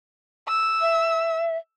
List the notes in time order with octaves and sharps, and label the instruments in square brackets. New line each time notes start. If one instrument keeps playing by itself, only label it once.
[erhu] E6
[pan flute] E5